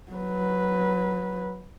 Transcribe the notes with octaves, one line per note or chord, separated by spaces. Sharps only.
F#3 B4